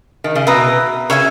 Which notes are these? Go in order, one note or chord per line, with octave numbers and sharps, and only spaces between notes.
D#3
C#3
B2 B4 E5 A#5 D#6
C#3 C#5 E5 G#5